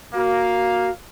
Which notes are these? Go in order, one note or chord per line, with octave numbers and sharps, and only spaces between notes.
A#3 F#4 F5